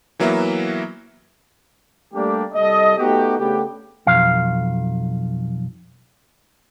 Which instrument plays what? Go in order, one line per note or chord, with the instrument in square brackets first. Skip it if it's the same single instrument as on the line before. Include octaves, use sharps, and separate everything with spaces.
[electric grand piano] E3 F#3 A#3 B3 E5
[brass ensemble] G3 A3 A#3 D4 G4
C2 G3 A4 D#5
A3 B3 D#4 F#4 G4
C#3 A3 B3 D4 G4
[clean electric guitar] B1 F2 F5